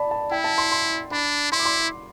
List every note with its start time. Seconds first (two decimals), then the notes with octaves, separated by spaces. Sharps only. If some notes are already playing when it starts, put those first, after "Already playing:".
Already playing: D5 A5 B5
0.11 A5
0.31 E4 G5
0.44 A5
0.58 C6
0.72 C6
1.11 D4 B5
1.52 E4 C6
1.59 D6
1.65 C6